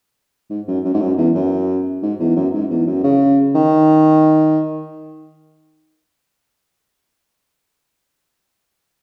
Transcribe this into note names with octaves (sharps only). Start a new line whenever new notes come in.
G#2
F#2
F#2
G#2
F#2
E2
F#2
G#2
E2
F#2
G#2
E2
F#2
C#3
D#3